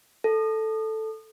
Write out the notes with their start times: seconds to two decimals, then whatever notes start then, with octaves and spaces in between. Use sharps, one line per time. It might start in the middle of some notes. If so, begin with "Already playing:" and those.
0.24 A4